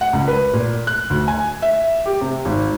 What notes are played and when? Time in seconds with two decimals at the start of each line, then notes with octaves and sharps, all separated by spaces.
0.01 F#5
0.13 C#2
0.28 B4
0.53 A#2
0.87 F#6
1.10 D2
1.28 G#5
1.62 E5
2.06 G4
2.21 C3
2.45 G#1